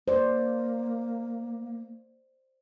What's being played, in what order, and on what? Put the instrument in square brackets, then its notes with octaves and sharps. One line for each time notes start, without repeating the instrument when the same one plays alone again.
[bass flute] A#3 [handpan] C5 D5